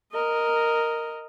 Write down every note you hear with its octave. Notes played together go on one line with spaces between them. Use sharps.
A#4 D#5